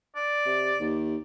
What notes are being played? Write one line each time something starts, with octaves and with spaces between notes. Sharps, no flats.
D5
C3
D#2